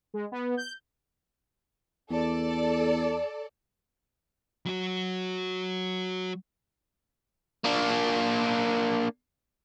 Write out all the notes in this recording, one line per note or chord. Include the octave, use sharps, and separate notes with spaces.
G#3
B3
G6
E2 A4 D5
F#3 F#4
A#3 D4